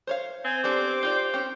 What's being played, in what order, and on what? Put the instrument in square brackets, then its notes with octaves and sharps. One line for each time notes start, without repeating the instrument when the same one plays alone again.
[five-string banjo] C5 C#5 F5
[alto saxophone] C4 [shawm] G#5
[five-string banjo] B3 D4 A4 [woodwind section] G4 C5 [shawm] D6
[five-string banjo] D#4 F4 D5 [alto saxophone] G5
[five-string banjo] C4 C#4